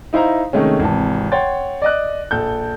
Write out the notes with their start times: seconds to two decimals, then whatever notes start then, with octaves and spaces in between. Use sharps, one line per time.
0.13 D#4 E4 C5 F5 A#5
0.53 C3 D#3 G#3 A3 C#4
0.80 G#1 C3 E3 A5
1.32 C#5 F#5 G5 C6 A6
1.82 D5 D#5 F#6
2.31 A#1 A4 G6